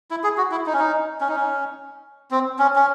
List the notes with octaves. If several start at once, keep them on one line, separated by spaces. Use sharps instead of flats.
E4
G#4
F#4
E4
D#4
C#4
D#4
C#4
D#4
C#4
C4
C#4
C#4